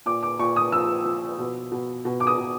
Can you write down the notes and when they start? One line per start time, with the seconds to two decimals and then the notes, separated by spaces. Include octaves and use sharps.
0.06 A#2 D6
0.23 D6
0.39 A#2 C#6
0.56 D#6
0.72 F3 E6
1.06 F3
1.39 B2
1.72 B2
2.05 B2
2.20 D6
2.27 D#6
2.38 B2